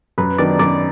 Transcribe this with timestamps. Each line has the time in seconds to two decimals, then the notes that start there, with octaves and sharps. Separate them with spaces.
0.18 F#2 B4
0.38 D#3 F#3 B3 D4 D5
0.59 F#2 D5